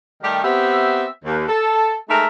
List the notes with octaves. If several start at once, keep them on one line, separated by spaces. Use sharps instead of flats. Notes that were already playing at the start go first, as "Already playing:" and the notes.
D#3 G3 A3 G4
B3 C4 G4 E5
D#2
A4
G#3 A3 D#4 A#4 E5